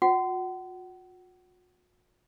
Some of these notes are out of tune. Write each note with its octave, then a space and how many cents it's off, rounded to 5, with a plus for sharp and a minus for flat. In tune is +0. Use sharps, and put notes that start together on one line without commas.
F#4 -45 F#5 +35